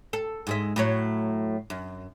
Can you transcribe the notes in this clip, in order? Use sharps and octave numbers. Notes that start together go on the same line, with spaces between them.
A4
G#2 G#3 E5
A2 F#3 C#5
F#2